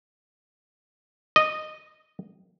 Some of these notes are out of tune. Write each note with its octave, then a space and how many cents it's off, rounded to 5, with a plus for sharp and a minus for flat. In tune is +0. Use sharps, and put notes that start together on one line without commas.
D#5 -10